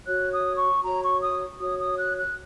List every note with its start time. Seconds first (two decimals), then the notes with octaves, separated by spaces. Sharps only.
0.07 F#4 C#5 F#6
0.32 D#6
0.57 C#6
0.84 F#4 C#5 A#5
1.03 C#6
1.22 D#6
1.60 F#4 C#5 D#6
1.79 D#6
1.98 F#6
2.19 F#6